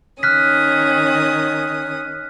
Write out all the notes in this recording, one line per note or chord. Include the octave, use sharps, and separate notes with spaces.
D#3 C#4 D#6 F6 F#6 B6